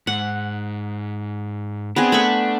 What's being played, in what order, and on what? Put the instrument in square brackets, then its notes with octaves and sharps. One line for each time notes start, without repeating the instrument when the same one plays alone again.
[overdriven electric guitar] G#2 [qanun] F#5
[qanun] B3 C4 G#4 [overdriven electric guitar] D4
[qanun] A3 B5 C#6